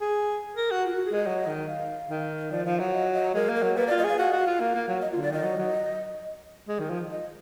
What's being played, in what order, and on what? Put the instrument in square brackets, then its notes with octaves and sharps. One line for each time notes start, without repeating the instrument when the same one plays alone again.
[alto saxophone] G#4
A#4
F#4
[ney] F4
F#4
G#4
[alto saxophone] G#3 [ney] D#5
[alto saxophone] F#3
D#3
[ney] F5
[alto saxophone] D#3
[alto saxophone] F3 [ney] D5
[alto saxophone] F3 [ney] F5
[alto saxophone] F#3 [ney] F5
[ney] D#5
D#5
[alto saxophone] G#3 [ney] A#4
[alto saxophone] A#3
[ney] A#4
[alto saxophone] F#3
[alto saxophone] A#3 [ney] B4
[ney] D5
[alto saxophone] F4
[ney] D#5
[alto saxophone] G#4 [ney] F5
[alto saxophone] F#4 [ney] F5
[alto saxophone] F#4
F4
A#3
A#3
F#3
[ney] D#5
F4
[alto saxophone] D3
[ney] D5
[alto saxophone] D#3 [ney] D#5
[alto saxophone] F#3
F#3
G#3
D#3
F3
[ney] D#5